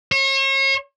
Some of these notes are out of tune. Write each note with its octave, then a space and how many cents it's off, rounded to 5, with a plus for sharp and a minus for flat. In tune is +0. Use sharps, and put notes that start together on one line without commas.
C#5 -40